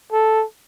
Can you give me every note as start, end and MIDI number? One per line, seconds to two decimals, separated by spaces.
0.12 0.45 69